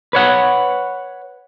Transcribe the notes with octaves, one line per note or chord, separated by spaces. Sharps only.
B4 C#5 F#5